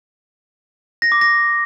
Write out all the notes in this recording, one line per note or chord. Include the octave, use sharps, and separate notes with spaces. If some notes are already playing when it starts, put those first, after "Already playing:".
A#6
D6
A#6